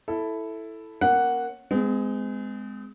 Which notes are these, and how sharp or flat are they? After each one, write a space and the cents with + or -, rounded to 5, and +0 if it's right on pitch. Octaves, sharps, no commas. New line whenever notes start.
E4 +0 A4 +0
A#3 +0 C#4 -20 F#5 +0
G#3 +0 C4 -45